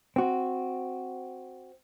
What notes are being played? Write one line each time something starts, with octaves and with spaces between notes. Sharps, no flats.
C4 F#4